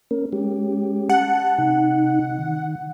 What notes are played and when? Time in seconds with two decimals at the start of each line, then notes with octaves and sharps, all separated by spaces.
0.11 A#3 C#4 A#4
0.33 G#3 C#4 G4
1.10 F#5 A5
1.58 C3 D#4
2.39 D#3